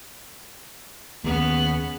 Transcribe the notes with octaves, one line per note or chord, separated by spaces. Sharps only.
D#2 C#3 B3